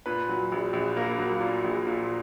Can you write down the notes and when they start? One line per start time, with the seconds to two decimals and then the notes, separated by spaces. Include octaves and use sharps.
0.06 A#2 B4
0.29 F#3
0.52 A#1
0.73 A#1
0.96 A#3 A#4
1.19 F#3
1.41 A#2
1.64 A#1
1.87 A#2